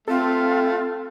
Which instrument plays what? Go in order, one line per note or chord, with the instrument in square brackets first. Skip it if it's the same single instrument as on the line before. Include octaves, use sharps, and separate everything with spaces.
[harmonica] A3 [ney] C4 [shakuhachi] F4 [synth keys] A4